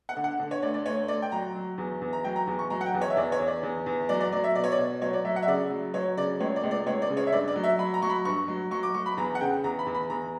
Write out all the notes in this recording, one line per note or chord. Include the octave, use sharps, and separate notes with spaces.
F#5
D3
F#5
D3
C#5
D2 D5
D5
D2 C#5
D2 D5
G5
F#3 A#5
F#3
E2
E2
A#5
F#3 G5
A#5
E2
C#6
F#3 A#5
F#5
G5
E2
C#5
E5
E2 D5
C#5
E2
D5
E2
E2
F#3 D5
D5
F#3 D5
E5
B2 D5
C#5
D5
B2
F#3 C#5
D5
F#3 E5
F#5
E5
C#3 D5
F#3
F#3 C#5
C#3 D5
C#2 C#5
D5
C#2
D5
C#2 C#5
D5
C#3
C#5
E5
G2 D5
D5
F#3
E5
F#3 B5
A#5
F#3 C#6
B5
G2 C#6
F#3
F#3 C#6
D6
F#3 C#6
B5
E2 A#5
F#5
C#3 G5
E2 A#5
B5
E2
B5
E2 A#5